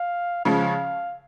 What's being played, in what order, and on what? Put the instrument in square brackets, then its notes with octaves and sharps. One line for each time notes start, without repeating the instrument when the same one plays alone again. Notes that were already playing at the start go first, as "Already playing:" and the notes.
Already playing: [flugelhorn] F5
[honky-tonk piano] C#3 F3 G#3 C#4 [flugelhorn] F5